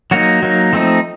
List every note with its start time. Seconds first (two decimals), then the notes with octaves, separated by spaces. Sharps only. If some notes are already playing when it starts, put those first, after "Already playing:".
0.11 F#3 A#3 D#4 F#4
0.43 F#3 A#3 D#4
0.73 F3 A3 C4 D#4